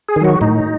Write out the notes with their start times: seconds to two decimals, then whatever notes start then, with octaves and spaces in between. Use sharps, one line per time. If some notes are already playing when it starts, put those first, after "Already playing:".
0.09 G#4
0.16 D#3
0.21 F#3 F#4
0.41 A2 D#4